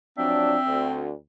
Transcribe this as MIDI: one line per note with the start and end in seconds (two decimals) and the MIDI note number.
0.18 0.57 53
0.18 0.57 54
0.18 1.08 60
0.18 0.57 62
0.18 0.83 76
0.68 1.12 38